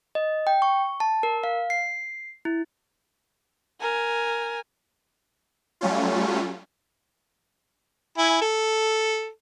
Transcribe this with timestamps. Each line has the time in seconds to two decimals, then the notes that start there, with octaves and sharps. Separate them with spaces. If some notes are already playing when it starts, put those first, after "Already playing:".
0.15 D#5
0.47 G5
0.62 C#6
1.00 A5
1.23 A#4
1.44 F5
1.70 C7
2.45 E4
3.80 A#4 G#5
5.81 F#3 G3 A3 C#4 F4
8.18 E4 G#5
8.42 A4